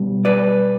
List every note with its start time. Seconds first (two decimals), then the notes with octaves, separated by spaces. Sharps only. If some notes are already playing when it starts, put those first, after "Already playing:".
Already playing: B2 G3
0.25 B4 D5